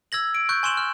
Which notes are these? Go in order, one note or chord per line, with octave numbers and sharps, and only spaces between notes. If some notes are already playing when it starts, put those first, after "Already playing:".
E6 G#6 A#6 F#7
D7
C#6 F#6 G6
G#5 C6 C#6 E7 F#7
F6